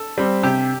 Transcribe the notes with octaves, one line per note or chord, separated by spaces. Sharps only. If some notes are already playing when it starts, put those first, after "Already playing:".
Already playing: A4
G3 C4
C3 G4